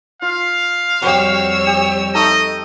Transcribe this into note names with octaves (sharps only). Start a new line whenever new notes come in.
F4 F5
F2 G3 F#4 G4 C#5 E6
G4
A3 D#4 D#5 A#5